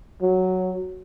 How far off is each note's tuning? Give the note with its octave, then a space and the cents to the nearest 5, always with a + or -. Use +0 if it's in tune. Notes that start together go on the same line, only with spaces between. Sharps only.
F#3 +0